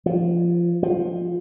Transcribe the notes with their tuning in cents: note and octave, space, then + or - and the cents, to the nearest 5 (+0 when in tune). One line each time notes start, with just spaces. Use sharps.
F3 -15
F3 +10